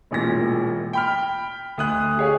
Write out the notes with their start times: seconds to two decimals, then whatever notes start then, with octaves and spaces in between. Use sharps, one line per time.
0.11 E1 A1 A#2 A#6
0.93 G5 B5 F6
1.78 D2 D#6 F#6
2.17 G4 G#4 C#5 F5